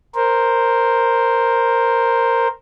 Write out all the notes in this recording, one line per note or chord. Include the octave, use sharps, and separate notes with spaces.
A#4 C5